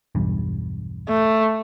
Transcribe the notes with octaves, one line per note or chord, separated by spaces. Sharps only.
B1 E2 G2
A3